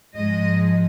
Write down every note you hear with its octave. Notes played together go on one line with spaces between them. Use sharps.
G#2 F3 G#3 D#5